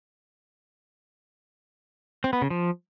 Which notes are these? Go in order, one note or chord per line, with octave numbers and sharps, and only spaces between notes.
C4
B3
C#3
F3